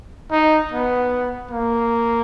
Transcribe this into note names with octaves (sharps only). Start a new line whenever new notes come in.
D#4
B3
A#3